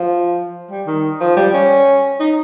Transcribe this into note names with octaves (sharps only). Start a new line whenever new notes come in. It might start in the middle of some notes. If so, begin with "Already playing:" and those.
Already playing: F3
G3
D#3
F3
G3
C#4
D#4